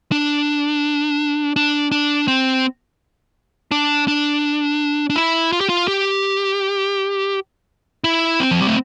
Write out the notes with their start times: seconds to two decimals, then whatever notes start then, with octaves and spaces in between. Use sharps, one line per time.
0.12 D4
1.56 D4
1.92 D4
2.28 C4
3.71 D4
4.08 D4
5.10 D4
5.16 E4
5.52 F4
5.61 G4
5.69 F4
5.88 G4
8.04 E4
8.40 C4
8.51 F3
8.60 G3
8.68 A3